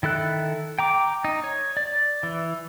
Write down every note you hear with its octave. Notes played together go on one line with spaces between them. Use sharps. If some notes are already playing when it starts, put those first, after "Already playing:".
D#3 E4 A4 F#6
G5 A#5 D6
D#4
C#5
D5
E3